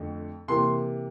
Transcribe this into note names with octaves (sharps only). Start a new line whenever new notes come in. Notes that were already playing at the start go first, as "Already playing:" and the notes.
Already playing: F2 D3 A3
C3 E3 A#3 C6